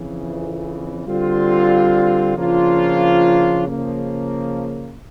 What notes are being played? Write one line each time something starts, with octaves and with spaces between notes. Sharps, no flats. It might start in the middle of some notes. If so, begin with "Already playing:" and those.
Already playing: F2 C#3 E3
D3 G3 C4 F4
C#3 F3 A#3 D4 F4
C#3 F3 A#3